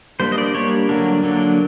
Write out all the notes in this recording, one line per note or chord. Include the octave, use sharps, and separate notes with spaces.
G3 A#3 D4 C5
D#5
D5
G3 A#3 D4 C#5
D3 F#3 A#3 D4
D3 F#3 A#3 D4